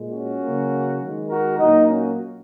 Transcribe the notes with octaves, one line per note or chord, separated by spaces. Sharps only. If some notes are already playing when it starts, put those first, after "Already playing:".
Already playing: A#2 G#3
C#4 F#4
C#3 F#3 A#3
D#3 G#3
F#4 A#4
A#2 F#3 A#3 D#4
C#4 F#4